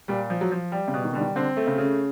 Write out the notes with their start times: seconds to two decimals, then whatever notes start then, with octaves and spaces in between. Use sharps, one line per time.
0.08 A#2 G3
0.30 F3
0.41 F#3
0.52 F3
0.72 G3
0.88 C#3
0.94 B2
1.04 D#3
1.13 D3 G3
1.20 D#3
1.36 D3 C4
1.57 A3
1.67 C#3
1.78 C#3